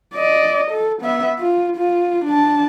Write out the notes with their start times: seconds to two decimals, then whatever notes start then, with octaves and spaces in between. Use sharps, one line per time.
0.15 D5 D#5
0.71 A4
1.02 B3 E5
1.39 F4
1.77 F4
2.25 D4 A5